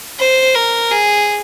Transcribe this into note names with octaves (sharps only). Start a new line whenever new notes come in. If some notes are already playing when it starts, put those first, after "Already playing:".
C5
A#4
G#4